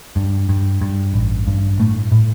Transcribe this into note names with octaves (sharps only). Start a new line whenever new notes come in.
G2
G2
G2
A1
G2
A2 A3
A2